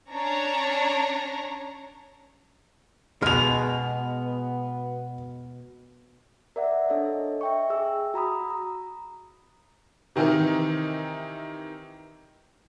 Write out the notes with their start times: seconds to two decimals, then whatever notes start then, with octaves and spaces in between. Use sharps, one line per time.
0.12 C#4 D4 C#5 A#5
3.22 B2 G#3 B3 F6 F7
6.56 A#4 D5 E5 F#5
6.88 D4 A4 C#5 D#5
7.41 E5 G5 C#6
7.70 G#4 E6
8.14 F#4 A#5 B5 D#6
8.50 A#5
10.16 C3 D#3 E3 D#4 A#4